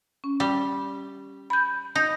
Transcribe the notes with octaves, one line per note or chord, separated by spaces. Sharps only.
C#4
G3
B5 G6
D#4 G6